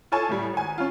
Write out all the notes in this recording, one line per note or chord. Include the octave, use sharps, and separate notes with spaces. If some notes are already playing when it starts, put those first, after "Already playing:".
F4 A4 C#5 G#5 A5
A2 G3
G#1 G#5
C#4 F4